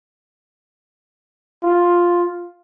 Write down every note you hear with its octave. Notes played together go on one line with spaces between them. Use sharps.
F4